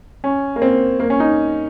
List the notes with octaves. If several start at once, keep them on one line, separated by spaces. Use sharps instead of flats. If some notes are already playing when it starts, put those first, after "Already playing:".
C#4
A#3
C4
A#3
C#4
D#4